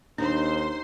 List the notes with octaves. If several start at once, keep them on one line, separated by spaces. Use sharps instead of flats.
D#2 D4 D#4 C5 C6